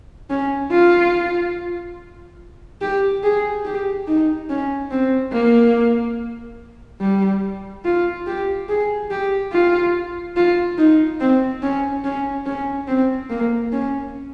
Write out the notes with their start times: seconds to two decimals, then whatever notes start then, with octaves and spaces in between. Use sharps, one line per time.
0.30 C#4
0.71 F4
2.81 G4
3.23 G#4
3.65 G4
4.07 D#4
4.49 C#4
4.91 C4
5.33 A#3
7.01 G3
7.85 F4
8.27 G4
8.69 G#4
9.10 G4
9.53 F4
10.36 F4
10.78 D#4
11.20 C4
11.63 C#4
12.04 C#4
12.46 C#4
12.88 C4
13.30 A#3
13.72 C#4